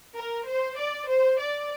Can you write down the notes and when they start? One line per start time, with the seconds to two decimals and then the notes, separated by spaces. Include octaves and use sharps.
0.14 A#4
0.46 C5
0.76 D5
1.07 C5
1.39 D5